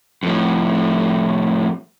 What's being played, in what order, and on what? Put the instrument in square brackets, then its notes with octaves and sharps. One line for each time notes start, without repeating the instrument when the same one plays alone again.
[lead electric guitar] F2 A2